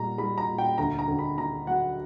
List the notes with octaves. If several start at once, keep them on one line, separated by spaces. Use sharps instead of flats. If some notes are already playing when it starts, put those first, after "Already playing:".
Already playing: A#2 G3 A#5
G3 B5
A#5
A#2
G5
D2 A#5
A#5
D2
B5
D3 A#5
F#3 F#5